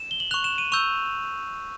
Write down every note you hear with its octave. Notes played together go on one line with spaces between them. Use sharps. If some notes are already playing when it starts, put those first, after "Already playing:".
Already playing: E7
G7
F#7
C#6 F#6 F7
E7
D#7
C#6 E6 G6 F7